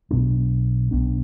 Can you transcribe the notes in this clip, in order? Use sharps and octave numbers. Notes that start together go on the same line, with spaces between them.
B1 B2 B3 D4
B1 B2 B3 D4